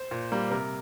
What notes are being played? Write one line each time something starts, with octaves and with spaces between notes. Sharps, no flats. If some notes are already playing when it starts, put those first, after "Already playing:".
Already playing: C5
A#2
G3 A#3
C3 A#4